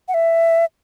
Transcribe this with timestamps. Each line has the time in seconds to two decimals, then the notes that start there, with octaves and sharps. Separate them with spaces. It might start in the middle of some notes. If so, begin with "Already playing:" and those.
0.08 F#5
0.14 E5